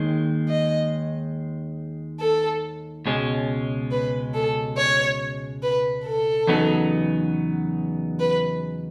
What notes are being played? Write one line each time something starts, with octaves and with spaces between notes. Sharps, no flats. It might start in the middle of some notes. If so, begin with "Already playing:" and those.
Already playing: D#2 D#3 G#3
D#5
A4
C#2 B2 G#3 C#4
B4
A4
C#5
B4
A4
E2 C#3 F#3 B3 D#4
B4